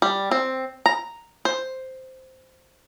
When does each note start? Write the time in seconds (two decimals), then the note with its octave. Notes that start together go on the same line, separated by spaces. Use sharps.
0.02 G3
0.31 C4
0.86 A#5
1.45 C5